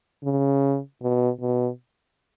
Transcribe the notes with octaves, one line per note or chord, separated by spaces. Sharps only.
C#3
B2
B2